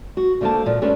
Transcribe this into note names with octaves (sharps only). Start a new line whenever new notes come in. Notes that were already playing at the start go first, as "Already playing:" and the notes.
F#4
D3 A3 A#3 A4 C5 A5
A#2 F3
G#3 A3 C#4 D4 B4